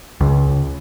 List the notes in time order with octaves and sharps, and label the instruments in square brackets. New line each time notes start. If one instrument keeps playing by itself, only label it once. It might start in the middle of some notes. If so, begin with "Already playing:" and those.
[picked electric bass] C#2